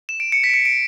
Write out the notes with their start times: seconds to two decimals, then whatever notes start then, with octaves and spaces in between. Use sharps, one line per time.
0.09 E7
0.20 D7
0.32 C#7
0.44 B6
0.49 D7
0.54 C#7
0.65 D7